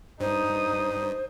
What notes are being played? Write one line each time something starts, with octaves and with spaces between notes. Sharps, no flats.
G2 D#4 C5 D#6